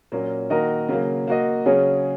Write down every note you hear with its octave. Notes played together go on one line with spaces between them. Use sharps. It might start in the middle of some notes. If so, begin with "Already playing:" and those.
A#2 F#3 A#3 C#4
D#3 A#3 F#4 A#4 D#5
C#3 F#3 A#3
A#3 F#4 D#5
C#3 F#3 C#4 G#4 C#5